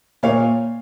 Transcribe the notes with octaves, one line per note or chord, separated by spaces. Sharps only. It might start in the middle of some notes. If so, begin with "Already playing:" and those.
A#2 C#5 F5